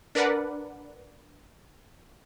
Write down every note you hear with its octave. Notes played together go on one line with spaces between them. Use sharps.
D4 A#4 B4 D5 F#5